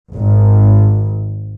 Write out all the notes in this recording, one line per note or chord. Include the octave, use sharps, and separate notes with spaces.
G#1